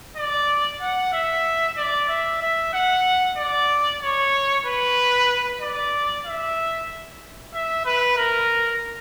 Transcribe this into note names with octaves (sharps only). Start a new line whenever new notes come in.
D5
F#5
E5
D5
E5
E5
F#5
D5
C#5
B4
D5
E5
E5
B4
A#4